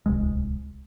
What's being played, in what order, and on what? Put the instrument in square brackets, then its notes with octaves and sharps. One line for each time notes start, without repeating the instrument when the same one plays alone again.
[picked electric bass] D1 C2 G#3